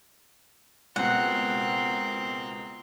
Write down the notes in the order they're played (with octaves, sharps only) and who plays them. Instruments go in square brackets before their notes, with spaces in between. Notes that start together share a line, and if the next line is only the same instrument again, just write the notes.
[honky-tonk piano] C#2 B2 [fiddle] C4 A#4 [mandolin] F#5